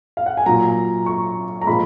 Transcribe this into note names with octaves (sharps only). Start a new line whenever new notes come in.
F5
F#5
G#5
A#2 F#3 A#5
C#6
A#5
A#2 F3 G#3 B5